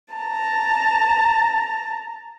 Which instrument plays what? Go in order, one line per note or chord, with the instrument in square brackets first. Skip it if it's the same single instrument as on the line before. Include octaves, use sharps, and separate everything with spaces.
[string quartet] A5 A#5